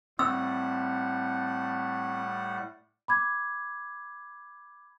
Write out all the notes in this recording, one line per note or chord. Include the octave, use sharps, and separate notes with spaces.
A2 G3 A3 C4 F#5 E6
B5 D6 G#6